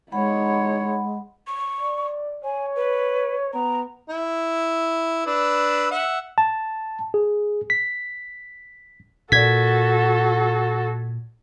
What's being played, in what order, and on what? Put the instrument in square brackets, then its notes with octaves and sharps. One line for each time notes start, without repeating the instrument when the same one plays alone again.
[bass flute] G#3 [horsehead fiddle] D#4 C#5 [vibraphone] F#5 B5
[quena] C#6
[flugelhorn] D5
[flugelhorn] C#5 [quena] G#5
[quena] B4
[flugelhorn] B3 [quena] A#5
[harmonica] E4
D4 B4 E6
E5 F#5
[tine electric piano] A5
G#4
B6
[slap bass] A#2 [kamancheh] F#4 A4 [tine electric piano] G#6 B6